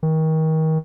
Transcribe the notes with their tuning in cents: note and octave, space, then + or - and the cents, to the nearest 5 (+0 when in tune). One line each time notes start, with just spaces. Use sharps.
D#3 +30